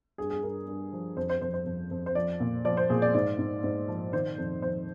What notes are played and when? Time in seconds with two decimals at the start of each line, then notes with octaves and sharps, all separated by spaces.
0.18 G2 G#4
0.30 G#4
0.43 G2 A#4
0.67 G2
0.93 F3
1.17 F2 C5
1.30 C5
1.41 F2 C5
1.54 C5
1.66 F2
1.91 F2
2.06 C5
2.15 F3 D5
2.40 A#2
2.65 F3 D5
2.77 C5
2.90 A#2 G#4
3.02 D5
3.14 G#2 D5
3.39 G#2
3.64 G#2
3.88 F3
4.13 D#3 C5
4.38 F2
4.62 F2 C5